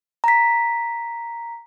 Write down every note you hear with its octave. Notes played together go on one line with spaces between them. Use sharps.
A#5 B6